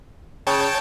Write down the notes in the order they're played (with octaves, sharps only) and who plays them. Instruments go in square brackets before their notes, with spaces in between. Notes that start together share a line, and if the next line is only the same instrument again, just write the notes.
[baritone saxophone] C#3 [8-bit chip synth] C#5 G5 A5